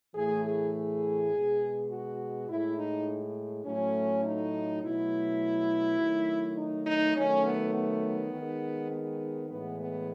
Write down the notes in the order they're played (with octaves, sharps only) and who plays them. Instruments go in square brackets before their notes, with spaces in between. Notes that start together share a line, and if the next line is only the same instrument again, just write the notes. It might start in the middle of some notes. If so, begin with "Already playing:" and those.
[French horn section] A2 E3 A3 G#4
G#4
G#4
B2 G#3
F#4
A2 G#3 E4
D#4
A2 F#3 A3 C#4
D#4
B2 F#3 A3 E4
D#3 F#3 A3
D#4
D#4
D#3 F#3 A3 C#4
B3
B3
D#3 G#3
B3
A2 E3 G#3 B3
B3